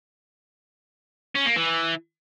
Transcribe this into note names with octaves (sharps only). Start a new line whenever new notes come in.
C#4
A#3
E3